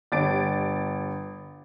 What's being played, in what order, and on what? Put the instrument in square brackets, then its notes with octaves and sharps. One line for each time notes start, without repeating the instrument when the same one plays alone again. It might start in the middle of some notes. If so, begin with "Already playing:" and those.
[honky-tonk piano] G1 A6 D7